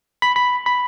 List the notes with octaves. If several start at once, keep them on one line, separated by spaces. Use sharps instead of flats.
B5
B5
B5